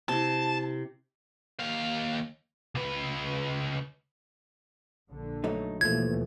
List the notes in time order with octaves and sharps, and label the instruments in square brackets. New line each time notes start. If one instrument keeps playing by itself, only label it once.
[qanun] C3 E4 [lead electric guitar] A5
[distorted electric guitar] D#2 F5
[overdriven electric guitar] C#2 B4
[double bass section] A#1 D3
[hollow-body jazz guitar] F#3 A3 D#4
[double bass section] D#2 B2 E3 [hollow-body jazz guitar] F3 A3 [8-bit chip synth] G#6